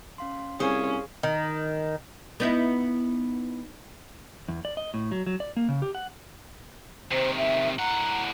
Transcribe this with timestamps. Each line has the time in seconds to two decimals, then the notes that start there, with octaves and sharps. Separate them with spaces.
0.18 C#4 F5 C6
0.60 C2 C#4 G#4 C5 F5 D#6
1.23 D#3
2.40 B3 D#4 E4
4.48 E2
4.65 D5
4.77 D#5
4.94 A2
5.11 F#3
5.26 F#3
5.40 D5
5.57 A#3
5.69 C#3
5.82 G4
5.95 F#5
7.11 C3 D#3 C5
7.37 E5
7.79 A2 F#5 A#5